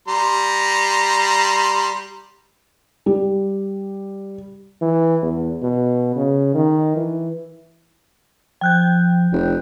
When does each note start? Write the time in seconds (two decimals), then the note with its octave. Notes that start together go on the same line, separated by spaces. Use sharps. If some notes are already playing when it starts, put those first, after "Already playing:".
0.08 G3 A#5 C6
3.06 G3
4.81 E3
5.22 E2
5.62 B2
6.16 C#3
6.55 D#3
6.96 E3
8.61 F3 G5 F#6 G6
9.32 F1